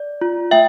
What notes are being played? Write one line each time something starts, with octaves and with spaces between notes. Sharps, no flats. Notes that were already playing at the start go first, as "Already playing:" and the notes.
Already playing: D5
F4
A3 E5 G5